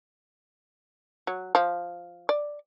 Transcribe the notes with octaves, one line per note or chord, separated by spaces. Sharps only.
F#3
F3
D5